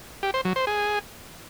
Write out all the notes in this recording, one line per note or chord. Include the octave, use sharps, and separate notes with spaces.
G4
C5
F#3
C5
G#4